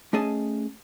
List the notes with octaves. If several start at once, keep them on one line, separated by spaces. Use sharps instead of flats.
A3 C#4 G#4 D#5 G#5 A5